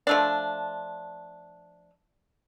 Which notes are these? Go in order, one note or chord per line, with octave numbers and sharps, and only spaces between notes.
F3 A3 D4